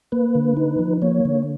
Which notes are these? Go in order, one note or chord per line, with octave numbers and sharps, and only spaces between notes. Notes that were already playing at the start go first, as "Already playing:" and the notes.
A#3 B4
D3
D#4
F3
A#3 C#5
D3